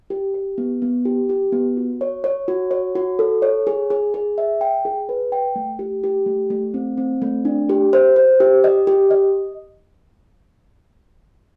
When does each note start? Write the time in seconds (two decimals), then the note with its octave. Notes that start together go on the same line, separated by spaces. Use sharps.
0.10 G4
0.34 G4
0.58 B3
0.82 B3
1.05 G4
1.29 G4
1.52 B3
1.77 F#4
2.01 C#5
2.24 C#5
2.48 F#4
2.71 C#5
2.95 F#4
3.19 A4
3.42 C#5
3.67 G#4
3.90 G#4
4.14 G#4
4.38 E5
4.61 G5
4.85 G#4
5.09 B4
5.32 G5
5.56 A3
5.79 G4
6.04 G4
6.26 A3
6.50 A3
6.74 C4
6.97 C4
7.22 A3
7.45 D4
7.69 G4
7.93 C5
8.16 C5
8.40 G4
8.64 D#5
8.87 G4
9.11 D#5